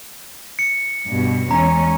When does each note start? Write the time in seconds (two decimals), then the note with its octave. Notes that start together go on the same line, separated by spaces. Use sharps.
0.59 C#7
1.06 G2 B2
1.51 E2 G#3 C#4 A#5